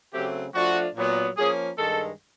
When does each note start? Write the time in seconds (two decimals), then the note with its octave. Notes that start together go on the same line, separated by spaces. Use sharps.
0.13 C#3 F#3 A3 C4 G4
0.53 F3 A3 D4 F4 F#4
0.95 A#2 F#3 B3
1.37 F3 A#3 C#4 G#4
1.78 G2 D#3 G#3 A4